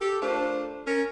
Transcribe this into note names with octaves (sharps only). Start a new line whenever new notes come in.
G4 A4
A3 D4 F4 A#4 C5
C#4 A#4